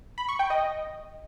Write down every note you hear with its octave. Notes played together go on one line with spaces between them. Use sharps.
B5
C#6
G5
D#5